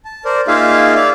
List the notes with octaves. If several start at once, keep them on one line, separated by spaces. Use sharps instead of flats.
A5
A#4 C5 D5
A#3 D#4 F4 G#4 E5 F5
D5 E5 F5